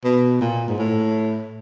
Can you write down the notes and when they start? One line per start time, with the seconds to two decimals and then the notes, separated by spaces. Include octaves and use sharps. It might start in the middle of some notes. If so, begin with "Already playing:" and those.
0.04 B2
0.41 A#2
0.68 G#2
0.78 A2